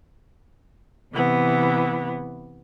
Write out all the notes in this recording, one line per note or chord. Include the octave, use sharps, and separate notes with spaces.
C3 E3 B3